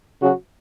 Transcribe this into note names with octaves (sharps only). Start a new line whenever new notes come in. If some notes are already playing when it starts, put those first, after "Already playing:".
C#3 F#3 C#4 F#4